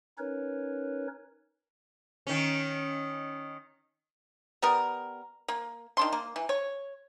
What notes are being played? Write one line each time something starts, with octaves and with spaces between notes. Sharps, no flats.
C#4 D#4 A#4 B4 C#5
D#3 C#4
G3 B3 A#4
A#3
D#3 D4 C6
A#3
E3
C#5